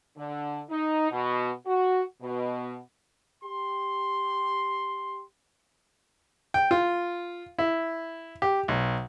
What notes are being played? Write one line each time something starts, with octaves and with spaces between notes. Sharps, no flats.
D3
D#4
B2
F#4
B2
G4 C6
G5
F4
E4
G4
B1